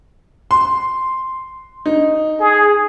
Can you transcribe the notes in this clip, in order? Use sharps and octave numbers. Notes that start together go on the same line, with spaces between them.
C6
D#4
G#4